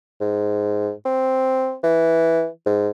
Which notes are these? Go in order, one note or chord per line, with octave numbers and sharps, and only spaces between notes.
G#2
C4
E3
G#2